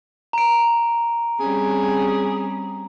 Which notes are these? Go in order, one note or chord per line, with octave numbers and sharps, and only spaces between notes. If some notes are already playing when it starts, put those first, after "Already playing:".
A#5 D7
G3 C4 C#4 G#4